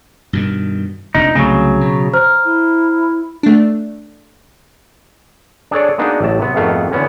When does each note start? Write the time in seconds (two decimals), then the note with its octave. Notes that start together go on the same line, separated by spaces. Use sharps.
0.33 G2 B2 D#3
1.15 F1 A#1 D4 D#4
1.35 C2 C#3 F#3 A3 C4
1.81 B2
2.13 C5 A#5 F6
2.45 E4
3.43 A3 D4
5.71 D4 G#4 A4 C#5 D5
5.98 G#3 A#3 B3 D4 D#4 F#4
6.20 A1 F#3 A3 G4 A5
6.39 C3 F#3 B3
6.56 G#1 F2 D#3 A3 B3 F5
6.92 D3 E3 B3 C#4 F#4